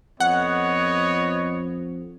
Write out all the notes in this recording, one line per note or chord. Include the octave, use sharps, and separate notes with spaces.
F2 B3 C#5 D#5 F#5